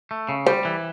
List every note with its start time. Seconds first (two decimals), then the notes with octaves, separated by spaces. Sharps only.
0.11 A3
0.29 C#3
0.46 G3 C5
0.65 E3